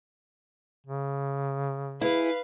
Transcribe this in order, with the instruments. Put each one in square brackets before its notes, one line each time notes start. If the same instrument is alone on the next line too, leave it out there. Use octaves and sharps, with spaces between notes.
[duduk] C#3
[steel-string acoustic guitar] E4 G#4 [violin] B4 F5